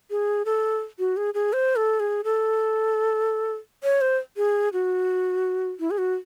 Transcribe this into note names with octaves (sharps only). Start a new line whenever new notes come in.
G#4
A4
F#4
G#4
G#4
C5
A4
G#4
A4
C#5
C5
G#4
F#4
E4
G#4
F#4